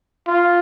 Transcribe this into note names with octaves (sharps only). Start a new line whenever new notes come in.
F4